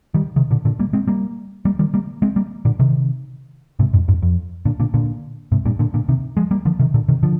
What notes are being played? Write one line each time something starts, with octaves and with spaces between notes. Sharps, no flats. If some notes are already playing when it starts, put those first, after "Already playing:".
D#3 G3
C3 D#3
A#2 D3
A#2 D3
G3 A#3
G#3 C4
G3 A#3
G3 A#3
D#3 G3
G3 A#3
G#3 C4
G3 A#3
A#2 D3
C3 D#3
G#2 C3
F2 G#2
F2 G#2
F2
A#2 D3
A#2 D3
A#2 D3
G#2 C3
G2 A#2
A#2 D3
A#2 D3
C3 D#3
F3 G#3
G3 A#3
D3 F3
C3 D#3
A#2 D3
C3 D#3
D3 F3